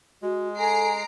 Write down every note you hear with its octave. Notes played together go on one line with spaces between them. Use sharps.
G#3 F#4
A4 G#5 A#5 C7 D7